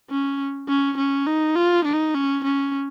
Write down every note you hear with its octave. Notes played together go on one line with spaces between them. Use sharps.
C#4
C#4
C#4
D#4
F4
D#4
C#4
C#4